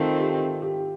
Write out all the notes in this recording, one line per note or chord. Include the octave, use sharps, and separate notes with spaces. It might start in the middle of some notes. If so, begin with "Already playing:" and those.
Already playing: D#3 A3 C4 F4
G4
G4